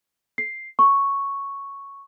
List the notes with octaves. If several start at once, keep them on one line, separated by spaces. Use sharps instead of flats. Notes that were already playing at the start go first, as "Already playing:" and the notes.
C7
C#6